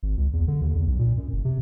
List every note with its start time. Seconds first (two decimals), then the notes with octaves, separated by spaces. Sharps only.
0.03 G#1
0.18 C#2
0.33 E2
0.48 D3
0.62 D#2
0.75 E2
0.87 B1
0.99 A#2
1.17 F#2
1.33 F#1
1.45 C3